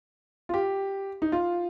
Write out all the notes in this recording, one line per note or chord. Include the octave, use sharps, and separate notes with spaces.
F4
G4
D#4
F4